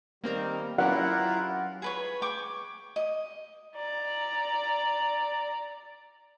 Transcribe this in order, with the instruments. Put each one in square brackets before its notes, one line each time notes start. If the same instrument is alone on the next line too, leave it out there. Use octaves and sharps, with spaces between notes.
[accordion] D#3 G3 [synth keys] A#3 C4 A#4
[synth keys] F#3 C#4 G4 [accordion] E4 F4 A#4 [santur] F#5
[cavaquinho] G#4 B4 C#5
G5 C#6 D6
D#5
[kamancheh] D5 A#5